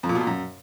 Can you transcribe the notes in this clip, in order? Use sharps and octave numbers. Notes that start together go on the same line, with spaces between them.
F2
A#2
B2
A#2
F#2